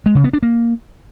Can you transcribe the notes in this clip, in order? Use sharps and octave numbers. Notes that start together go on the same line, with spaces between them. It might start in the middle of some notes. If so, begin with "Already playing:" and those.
G#3
C#3
B3
D4
A#3